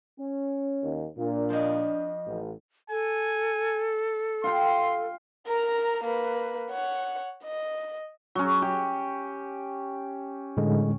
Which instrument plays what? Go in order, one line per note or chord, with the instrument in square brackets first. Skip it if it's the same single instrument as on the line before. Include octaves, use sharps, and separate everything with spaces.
[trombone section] C#4
[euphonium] D#2
[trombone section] A#2 [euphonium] D4
[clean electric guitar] F3 D#5
[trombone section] A1
[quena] A4 [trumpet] G#5
[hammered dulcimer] F4 G5 [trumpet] C6
[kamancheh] A#4 A#5
A#3 B4
C#5 F#5
D#5
[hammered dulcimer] F#3 C#4
G4
[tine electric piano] A2 D3 G#3